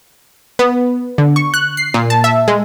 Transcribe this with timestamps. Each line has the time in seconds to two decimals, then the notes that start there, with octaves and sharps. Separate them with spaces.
0.59 B3
1.18 D3
1.36 C#6
1.54 F#6
1.77 C7
1.94 A#2
2.10 A5
2.24 E5
2.48 G#3